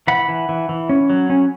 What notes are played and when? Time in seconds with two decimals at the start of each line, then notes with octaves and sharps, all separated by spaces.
0.07 E3 F#5 B5
0.28 E3
0.49 E3
0.69 E3
0.89 C#4
1.10 F#3
1.30 C#4